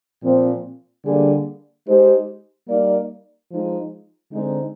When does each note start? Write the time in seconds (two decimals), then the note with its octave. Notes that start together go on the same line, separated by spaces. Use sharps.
0.23 A#2 F3 C4
1.05 D3 G3 A#3 D4 G#4
1.87 G#3 D#4 G4 C5
2.68 G3 A#3 D#4 A#4 D5
3.51 F3 G#3 D#4
4.32 D3 G#3 C4 D#4